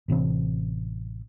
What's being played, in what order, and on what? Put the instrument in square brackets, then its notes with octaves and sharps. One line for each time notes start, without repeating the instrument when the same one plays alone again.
[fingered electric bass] A1 C3 E3 C4